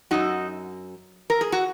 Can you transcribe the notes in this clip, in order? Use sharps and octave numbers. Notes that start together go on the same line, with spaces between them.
F#2 C#3 D#4 F#4
A#4
G#4
F#4